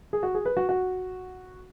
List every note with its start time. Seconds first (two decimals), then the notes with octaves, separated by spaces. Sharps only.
0.13 G#4
0.23 F#4
0.35 G#4
0.46 B4
0.57 F#4
0.69 F#4